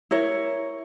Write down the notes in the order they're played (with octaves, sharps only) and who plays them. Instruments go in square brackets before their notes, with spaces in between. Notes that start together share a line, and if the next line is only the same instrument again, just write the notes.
[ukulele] E4 A#4 C#5